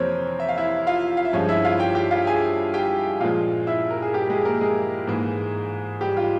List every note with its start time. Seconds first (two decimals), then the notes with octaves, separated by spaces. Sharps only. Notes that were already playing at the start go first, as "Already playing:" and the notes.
Already playing: F2 C3 E3 A#3 C4 A#4 C5 C#5
0.40 E5
0.49 F5
0.58 E4 E5
0.87 F4 F5
1.17 F5
1.25 E5
1.33 G2 F3 G#3 C#4 C#5
1.49 E4 E5
1.65 F4 F5
1.80 G4 G5
1.95 G4 G5
2.11 F4 F5
2.27 G#4 G#5
2.74 G4 G5
3.20 A#2 F3 G#3 F4 F5
3.67 E4 E5
3.91 A#4
4.02 G#4
4.14 G3 G4
4.30 G#3 G#4
4.45 A#3 A#4
4.61 G#3 G#4
5.07 G#2 E3 A#3
6.01 G3 G4
6.17 F4